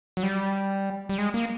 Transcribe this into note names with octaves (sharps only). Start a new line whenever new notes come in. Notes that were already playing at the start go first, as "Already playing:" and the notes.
F#3
G3
G3
G#3
A#3